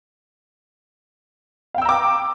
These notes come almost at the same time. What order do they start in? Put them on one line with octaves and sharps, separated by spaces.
F5 G5 E6 A#5 D6